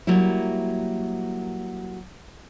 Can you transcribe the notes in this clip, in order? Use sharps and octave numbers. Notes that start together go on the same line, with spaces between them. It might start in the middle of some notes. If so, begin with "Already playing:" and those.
F#3 G3 A#3 E4